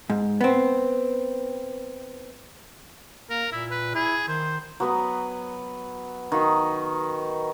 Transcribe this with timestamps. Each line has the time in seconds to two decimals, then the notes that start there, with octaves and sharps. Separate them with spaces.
0.10 G#2
0.41 B3 C4
3.30 A#3 A#4
3.52 A#2 E4
3.71 B4
3.95 E4 G#4
4.28 D#3 C5
4.80 F#3 B3 B4
6.32 D#3 F#4